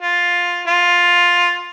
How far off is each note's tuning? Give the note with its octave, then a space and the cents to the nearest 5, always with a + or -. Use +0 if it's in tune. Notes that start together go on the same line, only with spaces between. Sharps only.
F4 +10
F4 +10